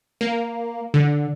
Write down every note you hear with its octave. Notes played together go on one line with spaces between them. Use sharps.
A#3
D3